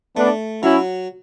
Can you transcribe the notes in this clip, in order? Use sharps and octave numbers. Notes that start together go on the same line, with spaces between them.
A3 B3 D4
F#3 C#4 E4